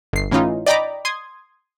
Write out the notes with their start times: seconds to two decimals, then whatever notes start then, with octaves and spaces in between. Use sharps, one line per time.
0.13 G1 C7
0.31 A2 E3 C#4 D#4 F4
0.66 D5 D#5 G5 A#5 B5 D6
1.05 C6 D#6 G#6